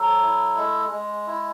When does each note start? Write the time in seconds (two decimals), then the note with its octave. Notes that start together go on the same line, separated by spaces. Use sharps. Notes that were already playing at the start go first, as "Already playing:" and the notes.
Already playing: F#3 A4
0.21 E4
0.57 G#3
0.91 G#3
1.27 E4